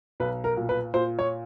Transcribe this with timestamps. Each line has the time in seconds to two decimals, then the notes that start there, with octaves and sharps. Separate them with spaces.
0.20 B1 B4
0.44 A#4
0.57 A#2
0.69 B4
0.94 A#2 C5
1.19 C#5